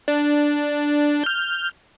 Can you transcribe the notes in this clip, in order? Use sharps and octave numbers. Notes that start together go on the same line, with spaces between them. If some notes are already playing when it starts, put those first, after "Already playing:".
D4
F6 G6